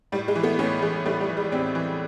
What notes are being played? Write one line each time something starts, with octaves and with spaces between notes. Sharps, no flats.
A2 G3
G#3
E3
A3 B3
A2 B3 C#4
E3 G#3
A2 G3 A3
G3
E3
G#3
A2 C4 D4
E3